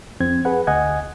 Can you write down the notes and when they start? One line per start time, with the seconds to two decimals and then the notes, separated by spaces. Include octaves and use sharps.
0.20 F2 C4 G#6
0.45 G#4 B4 F#5
0.67 D2 D#5 F#5 G#5 G#6